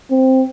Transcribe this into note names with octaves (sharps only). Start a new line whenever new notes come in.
C4